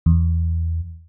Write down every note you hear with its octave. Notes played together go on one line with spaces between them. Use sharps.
E2